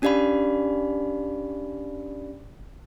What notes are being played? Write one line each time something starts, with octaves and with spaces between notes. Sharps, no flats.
C#4 D4 G4 D5 F5 B5